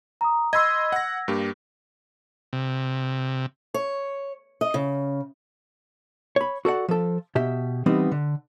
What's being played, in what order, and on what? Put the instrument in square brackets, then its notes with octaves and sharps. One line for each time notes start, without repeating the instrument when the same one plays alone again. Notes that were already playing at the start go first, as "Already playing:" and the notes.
[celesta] A#5 D#6
[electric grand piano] D#5 B5 C6 [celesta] E6 G#6
[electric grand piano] F#5 A#6
G2 A#3 G4
[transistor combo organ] C3
[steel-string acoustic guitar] C#5
D#5
C#3
[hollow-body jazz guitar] C#5 B5
F#4 A4 D5 F#5
F3 A4
B2 G4 E5
E3 G3 B3 C4 D#4
D3